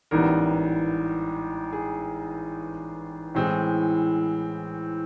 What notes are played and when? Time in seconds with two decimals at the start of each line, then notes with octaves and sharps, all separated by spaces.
0.11 A1 G#2 E3 G3 B3 A#4
1.73 G#4
3.34 A2 E3 G#3 C4